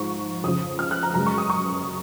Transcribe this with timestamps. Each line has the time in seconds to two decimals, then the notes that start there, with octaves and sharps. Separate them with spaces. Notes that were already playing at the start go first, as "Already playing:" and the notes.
Already playing: G#2 F3 G#3 C#6
0.43 F2 C#3 F3 D#6
0.79 F6
0.91 F#6
1.03 A#5
1.14 F#2 C#3 G#3 A#5
1.26 C#6
1.38 D#6
1.50 C#6